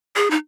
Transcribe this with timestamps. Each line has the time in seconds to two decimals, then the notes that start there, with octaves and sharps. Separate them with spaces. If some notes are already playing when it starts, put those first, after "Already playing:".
0.16 G#4
0.30 D#4